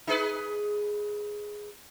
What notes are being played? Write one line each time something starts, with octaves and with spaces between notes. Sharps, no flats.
D#4 G#4 B4